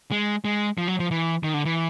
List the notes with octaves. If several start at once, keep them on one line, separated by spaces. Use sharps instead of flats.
G#3
G#3
F3
F#3
F3
E3
D#3
D3
E3